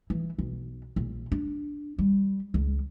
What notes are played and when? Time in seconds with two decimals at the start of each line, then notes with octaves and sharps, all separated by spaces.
0.10 E3
0.39 B1
0.96 A#1
1.32 D4
1.98 G3
2.54 C#2